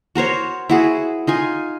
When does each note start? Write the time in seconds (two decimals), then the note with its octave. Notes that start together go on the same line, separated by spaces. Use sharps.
0.15 F#4 A#4 C5 C#5
0.69 E4 F#4 G#4
1.27 D#4 F4 G#5